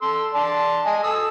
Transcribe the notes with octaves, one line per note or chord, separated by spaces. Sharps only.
A4 C6 E6
D5 A5 C6
D#5 G#5
A4 D#6 E6